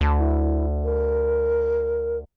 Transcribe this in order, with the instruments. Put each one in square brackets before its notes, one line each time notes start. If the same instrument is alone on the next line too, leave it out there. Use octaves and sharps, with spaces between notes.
[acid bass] D2 [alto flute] A5
[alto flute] E4
A#4